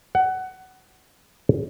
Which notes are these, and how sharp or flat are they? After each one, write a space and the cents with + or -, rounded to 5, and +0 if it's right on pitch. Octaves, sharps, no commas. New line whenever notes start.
F#5 +20